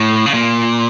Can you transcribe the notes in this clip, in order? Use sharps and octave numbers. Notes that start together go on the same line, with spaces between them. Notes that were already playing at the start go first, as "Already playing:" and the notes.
Already playing: A2
C#3
A#2